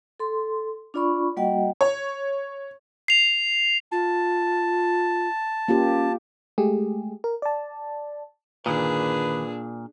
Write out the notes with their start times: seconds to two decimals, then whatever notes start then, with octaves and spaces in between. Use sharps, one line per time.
0.20 A4 C6
0.94 D4 F4 D5 B5 C#6
1.37 G3 A#3 F#4 D#5 F#5 G5
1.81 C#5
3.08 C7 F7
3.92 F4 A5
5.68 A#3 C#4 F4 G4
6.58 G#3 A3 G4 G#4
7.24 A#4
7.42 D5 A5
8.66 G1 A#2 D#3 D4 G#4 B4 D#6